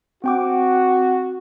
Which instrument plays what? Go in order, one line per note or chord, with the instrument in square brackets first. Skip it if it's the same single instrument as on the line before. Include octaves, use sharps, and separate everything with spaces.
[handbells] C4 G5 D6 [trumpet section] F#4